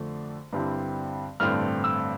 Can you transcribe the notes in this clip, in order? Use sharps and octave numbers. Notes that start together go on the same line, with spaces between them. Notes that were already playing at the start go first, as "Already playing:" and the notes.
Already playing: F2 D3 A3 D4
G2 D3 G3 C4 E4
A1 G2 D3 A3 C4 F6
E6